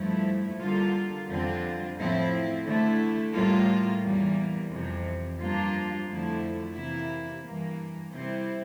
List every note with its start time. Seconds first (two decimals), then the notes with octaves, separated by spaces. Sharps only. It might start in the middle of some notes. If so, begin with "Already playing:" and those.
Already playing: G2 F3 A3 E4
0.60 D3 G3 A#3 F4
1.29 F2 D3 G3 C4 F4
1.97 A2 F3 C4 E4
2.65 D3 A3 E4
3.33 A2 G3 A#3 F4
4.02 E2 E3 G3 A#3
4.70 F2 C3 E3
5.38 G2 F3 A#3 D4 F4
6.06 F2 D3 F3 A3 E4
6.75 C3 E3 A#3 E4
7.43 G2 E3 A#3
8.11 C3 G3 C4 E4